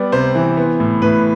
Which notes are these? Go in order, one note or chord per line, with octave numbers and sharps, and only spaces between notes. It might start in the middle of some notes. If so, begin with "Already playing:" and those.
Already playing: G3 B3 D5
C3 C5
E3
B3
A2
A2 B4